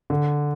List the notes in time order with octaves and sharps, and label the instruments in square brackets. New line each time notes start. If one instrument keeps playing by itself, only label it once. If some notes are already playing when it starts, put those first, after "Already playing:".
[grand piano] D3